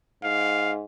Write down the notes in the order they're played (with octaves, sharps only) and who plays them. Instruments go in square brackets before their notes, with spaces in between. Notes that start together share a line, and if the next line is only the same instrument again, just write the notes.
[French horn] G#2 [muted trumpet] F5